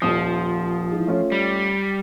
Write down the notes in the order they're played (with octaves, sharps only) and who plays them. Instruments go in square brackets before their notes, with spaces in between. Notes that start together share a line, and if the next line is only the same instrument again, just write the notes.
[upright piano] D#1 D#6 [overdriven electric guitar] F3
[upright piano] G#2 E3
A3 C#4 F4
[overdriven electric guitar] G3